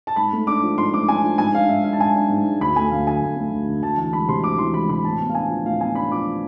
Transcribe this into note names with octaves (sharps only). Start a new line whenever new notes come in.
A5
G#2 B5
A3
D4 D6
F3
G#2 C6
A3 D6
D4 G#5
F3
G#2 G#5
D4 F5
G#2 E5
G#3 F5
A5
G#2 G#5
D4
G#2
G#3
D2 B5
A3 G#5
D2 F5
D3 G#5
D2
A3
D2
D3
D2 A5
E3 A5
G#3 B5
C3 C6
D2 D6
E3 C6
G#3 B5
C3 B5
A2 A5
B3
F5
D4 G#5
F3
A2 F5
B3 G#5
D4 B5
F3 D6